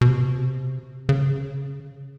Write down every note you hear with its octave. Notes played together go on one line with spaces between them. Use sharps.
B2
C3
C#3